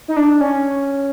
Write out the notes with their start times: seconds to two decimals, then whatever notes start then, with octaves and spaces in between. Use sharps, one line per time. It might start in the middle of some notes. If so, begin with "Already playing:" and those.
0.08 D#4
0.16 D4
0.41 C#4